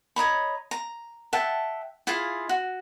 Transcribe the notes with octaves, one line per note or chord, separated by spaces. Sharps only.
C#5 D#5 A#5 B5
A#5
E5 F#5 G5 A5
E4 F4 G#4 F5
F#4